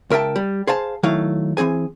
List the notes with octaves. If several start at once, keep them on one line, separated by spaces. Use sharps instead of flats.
C#2 A#4 E5 G5 A5
G3
G#4 C5 F5 A5
D#3 F#3 A3 E4 F5
E3 A3 C4 G#4 G#5